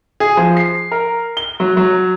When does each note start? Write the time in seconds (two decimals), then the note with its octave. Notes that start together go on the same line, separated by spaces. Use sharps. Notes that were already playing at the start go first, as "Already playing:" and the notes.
0.20 G#4
0.37 F3
0.57 C7
0.92 A#4
1.37 G7
1.60 F#3
1.77 F#3